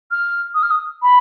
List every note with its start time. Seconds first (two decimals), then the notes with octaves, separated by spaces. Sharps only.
0.11 F6
0.54 D#6
0.63 F6
0.70 D#6
1.02 B5